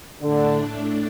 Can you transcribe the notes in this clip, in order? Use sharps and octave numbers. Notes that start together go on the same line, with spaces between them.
A2 D3 A3 D4